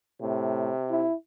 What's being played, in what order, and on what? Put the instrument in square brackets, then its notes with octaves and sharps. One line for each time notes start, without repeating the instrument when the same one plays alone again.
[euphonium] A2 [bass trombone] C3
[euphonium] E4